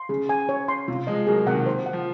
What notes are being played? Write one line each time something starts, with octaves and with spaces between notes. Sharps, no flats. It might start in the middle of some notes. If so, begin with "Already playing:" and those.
Already playing: C6
C#3 G#4
G#5
C#5
C6
C3 F4
F3 G#3 D#5
F#3 A#3 G#4
C3 D#3 F#5
C5
F#5
F3